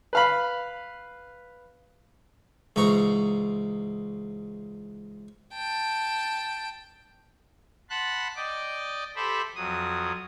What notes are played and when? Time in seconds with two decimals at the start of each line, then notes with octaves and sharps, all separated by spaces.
0.13 B4 F5 B5
2.76 C#2 G#2 E3 A#5 C#6
5.54 G5 A5
7.90 F#5 A5 B5 C6 F#6
8.36 D5 D#5 G5 D6
9.16 G4 A4 C5 E5 B5
9.56 F2 F#3 D#6